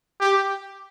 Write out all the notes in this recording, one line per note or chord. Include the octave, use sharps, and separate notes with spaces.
G4